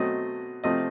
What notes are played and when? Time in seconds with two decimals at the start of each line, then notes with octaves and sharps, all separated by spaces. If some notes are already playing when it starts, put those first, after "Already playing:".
Already playing: B2 F#3 A3 C4 D#5
0.64 C3 F3 A3 C4 D#5